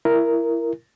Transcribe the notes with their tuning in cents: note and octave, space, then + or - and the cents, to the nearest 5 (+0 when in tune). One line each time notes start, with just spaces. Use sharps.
E4 +25 A#4 +0